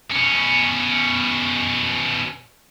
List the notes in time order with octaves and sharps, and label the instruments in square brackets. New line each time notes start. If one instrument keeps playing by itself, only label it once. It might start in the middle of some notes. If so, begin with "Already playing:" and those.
[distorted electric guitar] B2 C#4